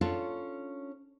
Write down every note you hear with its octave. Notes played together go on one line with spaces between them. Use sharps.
C#4 D4 F4 A4 C#5